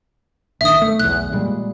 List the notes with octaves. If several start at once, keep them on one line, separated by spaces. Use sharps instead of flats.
A#1 D#3 E5 D#6
A3
B1 E2 F#6
A#2 G3 G#3